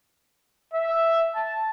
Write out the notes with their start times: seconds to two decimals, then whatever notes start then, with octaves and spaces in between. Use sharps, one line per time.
0.73 E5
1.35 A5